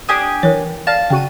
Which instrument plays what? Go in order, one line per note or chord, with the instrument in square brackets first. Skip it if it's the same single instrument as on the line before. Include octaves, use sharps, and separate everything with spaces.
[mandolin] D4 G4 G#5 [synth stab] D#6
[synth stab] E3 [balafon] A#4 C#5
[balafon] D5 [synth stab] F5 [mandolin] A5
[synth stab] C#3 F#4 D#7 [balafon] G5